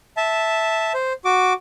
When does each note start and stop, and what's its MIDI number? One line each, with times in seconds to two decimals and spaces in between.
0.17 0.93 76
0.17 0.93 81
0.94 1.13 72
1.25 1.53 66
1.25 1.53 86